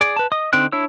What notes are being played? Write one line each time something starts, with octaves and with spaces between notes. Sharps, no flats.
G#4 D5
B4 A5
D#5 D#6
D3 C4 D#4 G5 F#6
D4 E4 C#5 E6